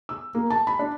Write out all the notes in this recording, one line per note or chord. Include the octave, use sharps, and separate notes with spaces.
E6
A#3
A5
B5
D4